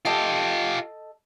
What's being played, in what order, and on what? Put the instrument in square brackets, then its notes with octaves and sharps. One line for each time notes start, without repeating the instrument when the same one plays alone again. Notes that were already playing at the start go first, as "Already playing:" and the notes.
[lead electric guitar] F4 G4 [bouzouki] A4 D#5 A5